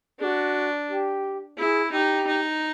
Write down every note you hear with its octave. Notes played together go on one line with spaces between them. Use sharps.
D4 F#4 G#4
G4
E4 G#4
D#4 G4
D#4